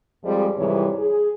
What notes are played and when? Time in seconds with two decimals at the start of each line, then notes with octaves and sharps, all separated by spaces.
0.24 F2 F3 G3 G#3
0.58 F2 G#2 C3 E3 G3 C#5
0.98 G#4